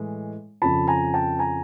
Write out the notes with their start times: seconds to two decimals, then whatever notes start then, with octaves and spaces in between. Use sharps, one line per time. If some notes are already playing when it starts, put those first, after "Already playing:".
Already playing: A2 E3 G#3
0.62 F2 C#3 F3 A5 B5
0.87 G#5 A#5
1.14 G5 A5
1.39 G#5 A#5